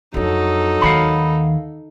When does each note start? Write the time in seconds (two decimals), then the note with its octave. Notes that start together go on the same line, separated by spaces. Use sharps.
0.14 F2 F#3 D4 D#4 A4
0.81 D#2 D#3 F5 F#5 B5